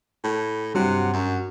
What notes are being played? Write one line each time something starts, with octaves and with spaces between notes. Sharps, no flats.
A2
G2 C3 F#3 F#5
F#2